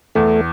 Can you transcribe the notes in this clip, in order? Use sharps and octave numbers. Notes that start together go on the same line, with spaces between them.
E2 A3